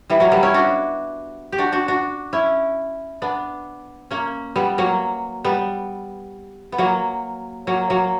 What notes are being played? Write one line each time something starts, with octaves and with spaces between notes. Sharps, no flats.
E3 G3
F#3 A#3
G3 B3
C#4 E4
D4 F#4
G4
D4 F#4
D4 F#4
D4 F#4
C#4 E4
B3 D4
A#3 C#4
G3 B3
F#3 A#3
G3 B3
B3
F#3 A#3
F#3 A#3
F#3 A#3